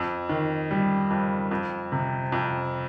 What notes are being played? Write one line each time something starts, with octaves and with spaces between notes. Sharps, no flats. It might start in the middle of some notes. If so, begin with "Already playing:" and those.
Already playing: F2
D#3
G3
F2
F2
C3
F2